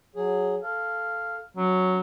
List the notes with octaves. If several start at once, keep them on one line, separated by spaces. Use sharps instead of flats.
F#3 G#4
A4 F5
F#3 C#4